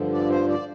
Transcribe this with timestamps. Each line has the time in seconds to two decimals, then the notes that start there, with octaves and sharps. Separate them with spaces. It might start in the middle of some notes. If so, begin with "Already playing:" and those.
Already playing: G2 D3 F3
0.12 D5
0.29 C5
0.49 D5